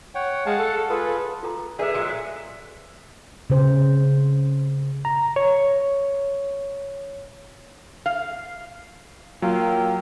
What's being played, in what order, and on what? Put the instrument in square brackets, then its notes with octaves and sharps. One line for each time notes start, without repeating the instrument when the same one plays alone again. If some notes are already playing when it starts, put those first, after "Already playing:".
[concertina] C#5 F#5 G5
[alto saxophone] G#3 [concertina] F5 F#5 A5
[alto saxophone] A4
[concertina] F4 G#4 A4 [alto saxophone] B4
[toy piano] F4 A4 A#5
[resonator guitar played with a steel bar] G#3 G#4 [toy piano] A4 B4 D5 [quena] E5
[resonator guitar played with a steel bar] A#2 F#3 G#3
[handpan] C#3 C5
[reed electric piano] A#5
C#5
[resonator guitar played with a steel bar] F5
[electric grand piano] F#3 [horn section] A#3 F4 G5